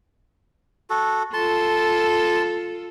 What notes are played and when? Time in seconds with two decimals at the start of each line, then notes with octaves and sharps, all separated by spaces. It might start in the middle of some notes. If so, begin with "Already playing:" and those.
0.90 F#4 A4
1.33 F4 A4 A5 C6